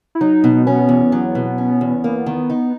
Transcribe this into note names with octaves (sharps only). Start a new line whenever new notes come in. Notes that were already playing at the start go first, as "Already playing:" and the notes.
E4
F#3 D#4
B2
B3 C#4
E2
F#3
B2
C#4
E2
A#3
D#3
D#4